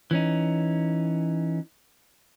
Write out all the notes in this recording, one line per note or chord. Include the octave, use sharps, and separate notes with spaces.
E3 C#4 D#4